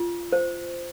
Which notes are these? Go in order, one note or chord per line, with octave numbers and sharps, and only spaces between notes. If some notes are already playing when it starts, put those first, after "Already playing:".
Already playing: F4
C5